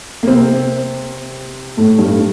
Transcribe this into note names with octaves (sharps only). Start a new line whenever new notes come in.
A#3
C3 C4
A2 A3
G2 G3